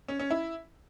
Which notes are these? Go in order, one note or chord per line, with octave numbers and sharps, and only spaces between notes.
C#4
C#4
E4